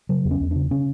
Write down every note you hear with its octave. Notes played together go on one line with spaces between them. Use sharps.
C#3 F#3
E2
C#4
E2
C#3 D4
C#3 C#4